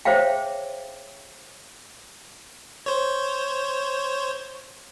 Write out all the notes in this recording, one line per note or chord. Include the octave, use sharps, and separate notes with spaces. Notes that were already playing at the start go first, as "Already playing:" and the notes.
G#4 C5 C#5 E5 F5 G5
C5 C#5